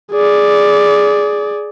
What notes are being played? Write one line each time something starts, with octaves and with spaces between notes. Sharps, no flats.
G#4 D5